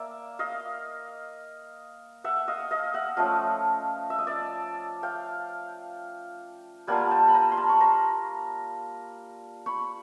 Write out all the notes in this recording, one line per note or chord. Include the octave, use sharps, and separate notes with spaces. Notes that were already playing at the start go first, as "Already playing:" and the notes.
Already playing: A#3 D5 E5
D#5 F5
E5 F#5
D#5 F5
D#5 F5
E5 F#5
F3 A3 C#4 D#5 F5
E5
D#5
D5 E5
F5 G5
G3 A#3 D4 F4 F#5 G#5
G5 A5
B5
G#5 A#5
C6
A5 B5
C#6
A#5 C6
B5 C#6